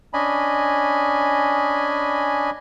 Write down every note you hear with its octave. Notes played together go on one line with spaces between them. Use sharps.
C#4 D4 D#5 G#5 B5